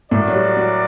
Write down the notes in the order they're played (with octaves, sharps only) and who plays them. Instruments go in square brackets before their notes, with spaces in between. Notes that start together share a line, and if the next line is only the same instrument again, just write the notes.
[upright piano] A2 A3 [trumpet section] F#4 A#4 D5
[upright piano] F#3
G3
F#3